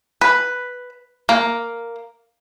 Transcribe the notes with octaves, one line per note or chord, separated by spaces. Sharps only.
B4
A#3